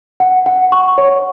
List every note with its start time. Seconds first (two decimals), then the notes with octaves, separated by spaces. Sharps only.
0.20 F#5
0.46 F#5
0.72 C#6
0.98 C#5